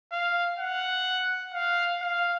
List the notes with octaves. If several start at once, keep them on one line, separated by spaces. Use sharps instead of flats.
F5
F#5
F5
F5